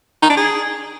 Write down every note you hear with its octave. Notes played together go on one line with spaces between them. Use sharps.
D#4
D4
G#4